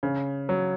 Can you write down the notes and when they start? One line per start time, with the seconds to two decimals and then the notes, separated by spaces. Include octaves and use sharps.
0.03 C#3
0.49 F#3